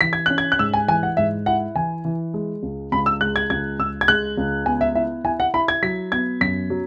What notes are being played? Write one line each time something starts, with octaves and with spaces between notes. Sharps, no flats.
E3 B6
G#6
C#4 F#6
G#6
F#6
G#2 E6
G#5
E3 G#5
F#5
G#2 E5
E4 F#5
E3 G#5
E3
G#3
C#2
C#2 B5
E6
G#3 F#6
G#6
C#2 G#6
C#2 E6
G#6
G#3 F#6
C#2
B3 G#5
E5
E4 E5
E4 G#5
F#5
E4 B5
G#6
F#3 B6
B3 G#6
F#2 B6
F#3